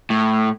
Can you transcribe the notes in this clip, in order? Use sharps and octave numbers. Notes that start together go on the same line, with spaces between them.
A2